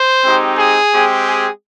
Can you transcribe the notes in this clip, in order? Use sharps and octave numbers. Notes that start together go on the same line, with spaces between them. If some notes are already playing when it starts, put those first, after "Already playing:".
Already playing: C5
G#3 C4 D#4 G4
G#4
G#3 C4 G4
G#4